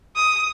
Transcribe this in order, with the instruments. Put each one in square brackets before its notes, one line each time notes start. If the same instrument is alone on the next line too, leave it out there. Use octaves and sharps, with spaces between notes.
[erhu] D#6